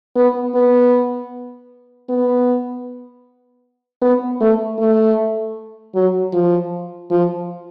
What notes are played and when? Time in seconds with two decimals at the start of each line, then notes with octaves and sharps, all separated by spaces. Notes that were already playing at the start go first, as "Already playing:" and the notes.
0.16 B3
0.55 B3
2.09 B3
4.02 B3
4.41 A3
4.79 A3
5.95 F#3
6.33 F3
7.11 F3